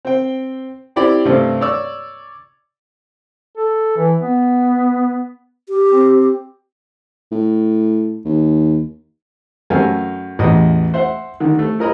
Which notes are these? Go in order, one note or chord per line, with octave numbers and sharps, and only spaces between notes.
C4 G5
C4 E4 G4 D5 B5
G2 C3 A3 C4 G4
C#5 D5 E6
A4
E3
B3
G4
C4
A2
D#2
F#2 A3 A#4 F5 G5 G#5
A1 E2 D#5
C5 E5 F#5
D3 D#3
A3
E4 A#4 D#5 A#5 B5